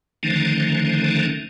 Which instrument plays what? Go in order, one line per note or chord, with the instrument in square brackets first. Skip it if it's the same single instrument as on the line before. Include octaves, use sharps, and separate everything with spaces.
[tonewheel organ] D3 D#3 F3 A3 C#4 D#4